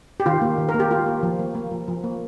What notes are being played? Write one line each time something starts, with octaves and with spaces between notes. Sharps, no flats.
G4
D#3 F4
A#3
D#3
A#4
A#3
G4
A#3 F4
A#3
F3
A#3
A#3
F3
F3
A#3